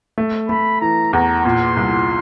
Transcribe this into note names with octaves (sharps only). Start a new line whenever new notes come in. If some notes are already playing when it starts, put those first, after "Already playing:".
A3
A3 B5
E3 A#5
E2 A#5
A#2 C6
C2